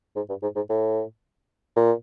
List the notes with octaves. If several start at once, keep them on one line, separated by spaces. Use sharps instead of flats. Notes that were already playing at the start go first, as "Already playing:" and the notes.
G#2
G2
G#2
G#2
A2
A#2